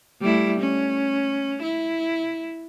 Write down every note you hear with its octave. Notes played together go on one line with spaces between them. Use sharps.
G3 A3 E4
C#4
E4